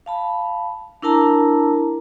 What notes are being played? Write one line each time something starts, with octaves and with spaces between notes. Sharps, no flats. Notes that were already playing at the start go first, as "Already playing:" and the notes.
F5 A5 B5
D4 E4 A#4 A5 A#5